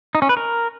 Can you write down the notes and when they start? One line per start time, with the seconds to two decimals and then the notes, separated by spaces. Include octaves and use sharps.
0.15 D#4
0.22 C#4
0.29 B4
0.37 A#4